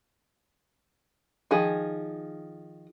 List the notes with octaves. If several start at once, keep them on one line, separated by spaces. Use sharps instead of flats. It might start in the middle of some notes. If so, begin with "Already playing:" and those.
D#3 F3 G#4